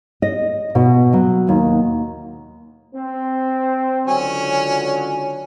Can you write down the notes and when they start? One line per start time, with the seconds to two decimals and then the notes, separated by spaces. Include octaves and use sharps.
0.22 D#5
0.75 B2
1.13 F#3
1.49 D#2
2.95 C4
4.07 C#2 D3 F#3 C#4